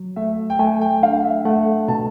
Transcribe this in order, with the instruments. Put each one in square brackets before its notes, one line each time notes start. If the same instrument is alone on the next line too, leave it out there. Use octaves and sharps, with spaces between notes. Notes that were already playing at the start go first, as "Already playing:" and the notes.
Already playing: [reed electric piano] F#3
[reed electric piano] A3 [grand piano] E5
[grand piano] G5
[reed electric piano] A3 [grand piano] G#5
[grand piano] G5
[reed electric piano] D4 [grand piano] F5
[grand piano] E5
[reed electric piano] A3 [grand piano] F#5
[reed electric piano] B2 [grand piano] A5